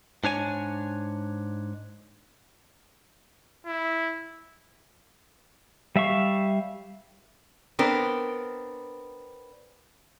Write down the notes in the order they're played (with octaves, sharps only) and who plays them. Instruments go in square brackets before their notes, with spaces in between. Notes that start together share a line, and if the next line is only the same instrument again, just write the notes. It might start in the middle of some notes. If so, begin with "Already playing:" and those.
[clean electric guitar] G#2 D4 C#5 G#5
[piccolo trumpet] E4
[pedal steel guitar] G3 E5 F5 C#6
[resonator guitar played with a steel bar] B3 C4 D4 A#4